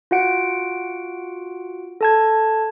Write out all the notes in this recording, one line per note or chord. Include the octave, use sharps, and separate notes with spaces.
F4 F#4 F#5 D7
A4 A5 G#6